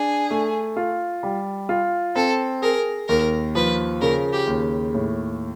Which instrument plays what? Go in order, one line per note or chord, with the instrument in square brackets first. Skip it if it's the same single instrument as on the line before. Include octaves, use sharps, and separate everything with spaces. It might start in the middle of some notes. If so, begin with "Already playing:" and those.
Already playing: [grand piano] D4 [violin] G#4
[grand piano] A3
F4
G3
F4
[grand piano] C4 [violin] A4
[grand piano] G#4 [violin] A#4
[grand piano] D#2 [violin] A#4
[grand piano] F3 [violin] B4
[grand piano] C#3 [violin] A#4
[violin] G4
[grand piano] D#2
A2